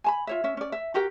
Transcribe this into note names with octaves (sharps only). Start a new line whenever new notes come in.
G#5 A5 B5
F4 C#5 E5
C#4 E5
C#4 D5
E5
F#4 G4 A#4 G5